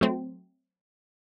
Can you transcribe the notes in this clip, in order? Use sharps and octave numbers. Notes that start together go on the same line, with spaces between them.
F#3 A3 C4